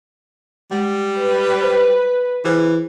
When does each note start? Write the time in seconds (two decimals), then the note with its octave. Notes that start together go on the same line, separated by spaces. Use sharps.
0.71 G3 G#3
1.18 B4
1.62 C5
2.45 E3 E4 G#4 C5